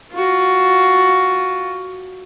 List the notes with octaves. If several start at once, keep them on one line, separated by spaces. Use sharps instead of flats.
F4 F#4